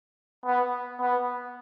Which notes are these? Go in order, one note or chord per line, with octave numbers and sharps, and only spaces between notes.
B3
B3